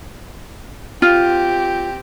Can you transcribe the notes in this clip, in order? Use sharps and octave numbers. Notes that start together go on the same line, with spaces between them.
C4 F4 G4